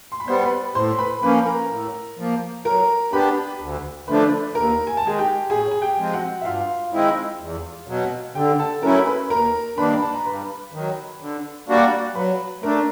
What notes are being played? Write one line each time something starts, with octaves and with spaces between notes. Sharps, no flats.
C6
B5
G3 B3 C5 C6
B4 B5
A2 C5 C6
B4 B5
F3 A#3 C#4 B4 B5
A#4 A#5
A2
F3 A#3
F#3 A#4 A#5
B3 D4 G4 B4 B5
D2
D3 F3 A3 D4 B4 B5
D#2 A#4 A#5
G#5
A5
D#3 G#3 G#4 G#5
G4 G5
A2 G#4 G#5
G#5
G4 G5
F3 G#3 C4
F#4 F#5
E5
G2 F4 F5
D#3 G#3 C4 E4
E2
B2 F#3
D3 G4 G5
A4 A5
F#3 A3 C#4 E4 A#4 A#5
B4 B5
D#2 A#4 A#5
D#3 G3 A#3 D4 B4 B5
A5
A#5
G2 B4 B5
D#3 F#3
D3
G3 A#3 D4 F#4
F#3 B4 B5
A3 D4 A#4 A#5